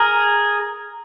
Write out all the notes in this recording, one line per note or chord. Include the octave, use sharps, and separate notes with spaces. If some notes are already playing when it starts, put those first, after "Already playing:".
Already playing: G#4 A#4